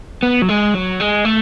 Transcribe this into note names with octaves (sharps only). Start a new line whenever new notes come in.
B3
F#3
G#3
F#3
G#3
A3